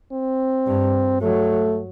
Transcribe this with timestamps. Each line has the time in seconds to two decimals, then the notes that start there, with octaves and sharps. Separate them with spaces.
0.12 C4
0.67 G2
1.22 F#3 A3